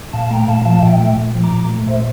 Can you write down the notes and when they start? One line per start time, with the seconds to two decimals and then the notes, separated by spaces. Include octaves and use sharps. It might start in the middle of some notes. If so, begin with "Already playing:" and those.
0.13 A#2 F5 A5
0.31 A3 G5 A#5
0.48 A#2 F5 A5
0.65 F3 F5 A5
0.83 A#2 E5 G5
1.00 A3 E5 G5
1.18 A#2
1.35 F3
1.43 A#5 D6
1.52 A#2
1.69 A3
1.87 A#2 C5 E5